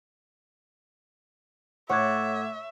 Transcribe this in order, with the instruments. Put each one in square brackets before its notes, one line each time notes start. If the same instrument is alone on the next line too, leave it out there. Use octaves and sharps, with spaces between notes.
[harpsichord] A2 [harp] C#5 F#6 A6 [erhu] E5 [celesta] F#5 D6 G#6